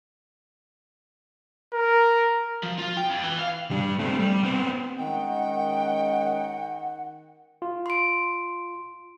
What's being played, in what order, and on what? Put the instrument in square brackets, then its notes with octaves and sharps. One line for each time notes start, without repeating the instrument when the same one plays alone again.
[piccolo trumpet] A#4
[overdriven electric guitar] F3
F4
G5
F2
E3
F5
[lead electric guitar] G3 D4
A3 C4
G3
B3 C4
[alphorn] D#3 [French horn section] G#3 C#4 D#5 [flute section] F#5 [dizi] G5
[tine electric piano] F4
[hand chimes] C6 D7